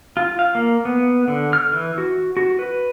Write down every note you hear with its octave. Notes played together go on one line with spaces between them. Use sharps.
F4
F5
A#3
B3
D3
F6
E3
F#4
F#4
B4